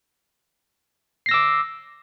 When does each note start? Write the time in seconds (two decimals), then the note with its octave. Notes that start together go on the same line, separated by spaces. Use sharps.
1.26 C7
1.29 A#6
1.31 E6
1.34 D6